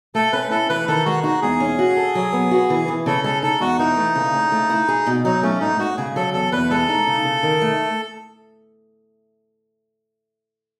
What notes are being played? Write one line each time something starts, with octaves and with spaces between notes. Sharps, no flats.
A3 A4
C#4 B4
E4 A4
E3 B4
D#3 A4
G#3 F#4
D#4 F#4
E2 G#4
C#4
F#4
A4
F#3
B3
F#4
E3
E3
C#3 A4
G#3 A4
D#4 A4
E2 F#4
E3 D#4
A3
C#3
C#3
A3
E4
G#4
B2
F#3 D#4
A3 C#4
G#2 D#4
G#2 F#4
C#3 G#4
F#3 A4
E2 A4
E2 B4
G#3 A4
D#4
C#3
C#3
D#3
A3